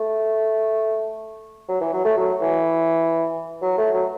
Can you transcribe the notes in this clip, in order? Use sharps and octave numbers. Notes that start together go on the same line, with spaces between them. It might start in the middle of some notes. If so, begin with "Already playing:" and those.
Already playing: A3
F#3
E3
F#3
A3
F#3
E3
F#3
A3
F#3